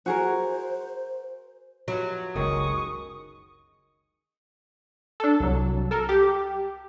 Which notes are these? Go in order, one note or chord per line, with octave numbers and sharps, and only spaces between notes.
F#4 G#4 A#4 C5
F3 F#3 B4 E5
F#1 C#2 D#3 G#3 C#4 C#6 D#6
D4 A4
C2 F#3
A4 A#4
G4